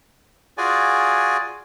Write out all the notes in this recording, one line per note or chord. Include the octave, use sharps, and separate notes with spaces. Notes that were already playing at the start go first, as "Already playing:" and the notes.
F4 F#4 G#4 D5 G#5